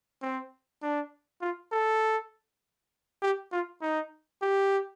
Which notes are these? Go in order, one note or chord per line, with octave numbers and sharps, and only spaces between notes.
C4
D4
F4
A4
G4
F4
D#4
G4